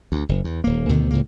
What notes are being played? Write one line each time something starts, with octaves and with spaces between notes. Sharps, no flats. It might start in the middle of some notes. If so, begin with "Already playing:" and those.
D2
F#1
E2
D#1 A#3
D2 B2 D3 D#3
C#2 A2 C#3 A#3